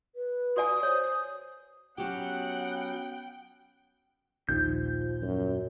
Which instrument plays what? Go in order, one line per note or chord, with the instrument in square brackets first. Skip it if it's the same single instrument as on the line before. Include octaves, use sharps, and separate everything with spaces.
[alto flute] B4
[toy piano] F#4 D5 G#5 [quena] D#6
[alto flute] C5 [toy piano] C#5
[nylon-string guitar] F#3 G4 [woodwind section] B3 C#4 [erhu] F#5 [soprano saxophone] G5
[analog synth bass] A#1 [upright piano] D#2 [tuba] F3 [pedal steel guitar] G6
[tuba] F#2